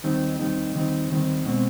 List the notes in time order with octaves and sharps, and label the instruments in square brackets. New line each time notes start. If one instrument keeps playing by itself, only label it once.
[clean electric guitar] D#2 D#3 G3 C4 D#4
D#2 D#3 G3 C4 D#4
D#2 D#3 G3 C4 D#4
D#2 D#3 G3 C4 D#4
B2 G#3 C4